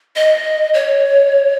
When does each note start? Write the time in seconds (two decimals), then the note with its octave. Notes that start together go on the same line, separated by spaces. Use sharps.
0.16 D#5
0.74 C#5